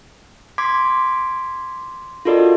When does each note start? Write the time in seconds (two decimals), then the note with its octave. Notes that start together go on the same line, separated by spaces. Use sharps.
0.58 C6 D6 G#6 B6
2.25 F4 F#4 A4 A#4 D5 D#5